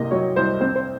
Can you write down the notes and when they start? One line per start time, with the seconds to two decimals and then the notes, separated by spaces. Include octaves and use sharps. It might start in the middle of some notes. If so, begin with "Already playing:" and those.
Already playing: C2 C3 A#3 D#5
0.11 F#3 C#5
0.36 C2 C5
0.61 C4 C5
0.76 C5